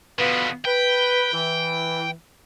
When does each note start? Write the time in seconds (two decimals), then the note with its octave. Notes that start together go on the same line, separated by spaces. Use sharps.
0.19 B2 D3 B3 F4 B4
0.65 B4 G5
1.32 E3